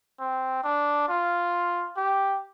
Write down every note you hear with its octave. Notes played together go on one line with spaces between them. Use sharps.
C4
D4
F4
G4